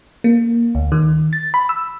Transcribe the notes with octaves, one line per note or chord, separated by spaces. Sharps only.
A#3
D2
D#3
A6
B5
E6